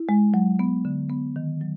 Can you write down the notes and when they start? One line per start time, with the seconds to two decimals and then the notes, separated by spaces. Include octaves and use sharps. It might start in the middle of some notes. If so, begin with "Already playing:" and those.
Already playing: E4
0.09 G#3
0.34 F#3
0.59 B3
0.85 D3
1.10 B3
1.36 D#3
1.61 F#3